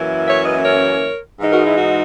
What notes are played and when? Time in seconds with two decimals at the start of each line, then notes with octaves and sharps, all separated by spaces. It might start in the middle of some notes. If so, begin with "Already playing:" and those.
Already playing: F#2 E3 A#3 C#4 E4
0.27 C#5 E5
0.45 B4 D#5
0.65 A#4 C#5
1.40 G#2 E3 G#3 D#4
1.53 F#4 A#4
1.66 E4
1.78 F#4